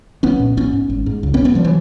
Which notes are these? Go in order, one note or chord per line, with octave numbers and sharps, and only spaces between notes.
B1 B3 C#4
A#2
A#1 B3 C#4
G#2
G#1
G#2
C#2
B3 C#4
C3
B3 C#4
F3 G3
E3 F#3